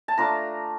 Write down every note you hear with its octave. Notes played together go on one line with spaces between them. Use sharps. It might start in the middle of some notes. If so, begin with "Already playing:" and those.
A5
A3 D4 F4 A#5